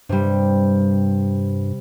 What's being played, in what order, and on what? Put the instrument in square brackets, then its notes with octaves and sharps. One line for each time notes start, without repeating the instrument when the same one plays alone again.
[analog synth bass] G2 [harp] C3 G3